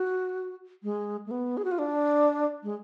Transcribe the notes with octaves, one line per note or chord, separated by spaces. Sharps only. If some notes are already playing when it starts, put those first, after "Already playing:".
Already playing: F#4
G#3
A3
B3
G#4
F#4
F4
D4
G#3